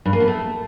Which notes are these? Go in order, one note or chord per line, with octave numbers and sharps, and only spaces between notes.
G2
A#3
B3
A3